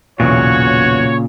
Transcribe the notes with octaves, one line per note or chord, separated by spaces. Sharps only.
B1 E2 A#2 C#3 E3 F#4 C#5